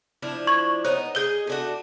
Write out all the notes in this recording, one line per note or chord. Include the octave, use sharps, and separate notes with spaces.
F3 D4 E4
C#6 G#6 F#7
B3 D#4 C5 C#5 F#6
G#4 D#5 G6 G7
A3 D4 F#4